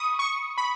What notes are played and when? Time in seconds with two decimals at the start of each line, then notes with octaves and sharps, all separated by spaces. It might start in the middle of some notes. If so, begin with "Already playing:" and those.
Already playing: B5 C#6 D#6
0.19 C#6
0.58 B5